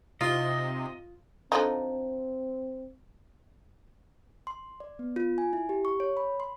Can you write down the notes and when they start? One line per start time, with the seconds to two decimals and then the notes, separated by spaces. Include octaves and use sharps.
0.21 C3 D#4 F4 D#5 C6
1.52 D3 F3 C4 D#4
4.47 C6
4.80 D5
4.99 B3
5.16 F4
5.38 G#5
5.53 E4
5.69 G4
5.85 C#6
6.00 C#5
6.17 B5
6.40 C6